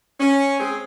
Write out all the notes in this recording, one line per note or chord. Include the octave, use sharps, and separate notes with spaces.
C#4
G#3 C4 G#4